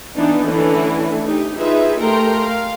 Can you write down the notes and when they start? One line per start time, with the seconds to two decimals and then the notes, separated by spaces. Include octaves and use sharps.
0.15 E3 B3 D4 D#4
0.44 D3 E3 A3 C#4 D4 E4
1.24 D#4 G4
1.57 D#4 F4 G#4 B4 E5
2.00 A3 G4 A#4 G5 A#5 C6
2.38 F5